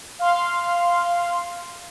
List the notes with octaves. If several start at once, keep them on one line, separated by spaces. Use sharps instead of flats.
F5 C6